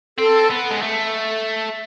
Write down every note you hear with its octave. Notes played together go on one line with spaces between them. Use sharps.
C4 A4
B3
G#3
A3